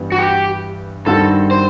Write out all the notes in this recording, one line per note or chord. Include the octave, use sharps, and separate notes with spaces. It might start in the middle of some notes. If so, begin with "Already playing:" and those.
Already playing: G2 E3 G3 B3
F#4
G4
G2 D#3 G3 C4 F#4 A4
C5